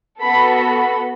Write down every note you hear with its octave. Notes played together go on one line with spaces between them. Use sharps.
B3 F#4 A4 B5
B5